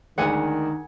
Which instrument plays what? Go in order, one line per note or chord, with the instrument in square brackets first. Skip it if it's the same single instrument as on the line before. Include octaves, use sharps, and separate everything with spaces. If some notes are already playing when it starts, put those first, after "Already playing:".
[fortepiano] D2 G#3 [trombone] D#3 [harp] F#5 G#5